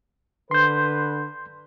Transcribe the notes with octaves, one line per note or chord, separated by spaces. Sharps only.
D3 B4 C6 G6